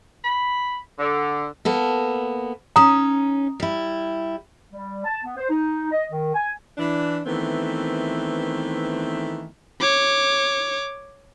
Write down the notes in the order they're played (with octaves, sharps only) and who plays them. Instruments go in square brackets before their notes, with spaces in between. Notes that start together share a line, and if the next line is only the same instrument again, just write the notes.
[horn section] B5
D3
[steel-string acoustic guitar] A#3 B3 A4
[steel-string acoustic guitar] C#4 D#4 [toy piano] A#5 D#6
[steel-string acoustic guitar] G3 E4
[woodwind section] G3
A5
B3
C5
D#4
D#5
D#3
G#5
[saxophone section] E3 D4
D#3 E3 A3 B3 C4
[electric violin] C#5 D6